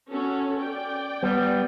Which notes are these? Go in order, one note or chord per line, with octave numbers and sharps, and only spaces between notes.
C#4 F#4 A4
D5 G5
G3 B3